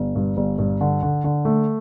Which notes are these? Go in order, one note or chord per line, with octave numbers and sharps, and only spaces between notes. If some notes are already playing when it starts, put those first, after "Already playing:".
Already playing: G1
G2
G1
G2
D3
D3
D3
A3